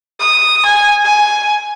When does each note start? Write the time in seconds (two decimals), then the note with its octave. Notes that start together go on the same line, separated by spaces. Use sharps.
0.20 D#6
0.66 G#5
1.05 G#5